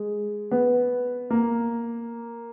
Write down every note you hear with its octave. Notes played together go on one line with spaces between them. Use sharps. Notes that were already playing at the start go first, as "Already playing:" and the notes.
Already playing: G#3
B3
A#3